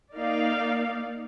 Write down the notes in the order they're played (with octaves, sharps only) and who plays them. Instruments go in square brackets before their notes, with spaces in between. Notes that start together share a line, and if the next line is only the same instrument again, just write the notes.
[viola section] A#3 D#4 D5 F5